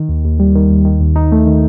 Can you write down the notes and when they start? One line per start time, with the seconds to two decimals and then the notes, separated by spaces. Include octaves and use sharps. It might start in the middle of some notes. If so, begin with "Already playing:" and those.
Already playing: D#3
0.09 D#2
0.25 D#2
0.39 G3
0.55 D#3
0.70 D#2
0.85 D#3
1.00 D#2
1.16 D#4
1.32 A3
1.47 D#3